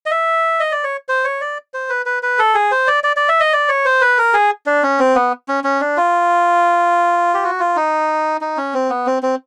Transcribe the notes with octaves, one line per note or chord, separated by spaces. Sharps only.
D#5
E5
D#5
D5
C#5
C5
C#5
D5
C5
B4
B4
B4
A4
G#4
C5
D5
D5
D5
E5
D#5
D5
C#5
C5
B4
A#4
G#4
D4
C#4
C4
B3
C#4
C#4
D4
F4
G4
F#4
F4
D#4
D#4
C#4
C4
B3
C4
C4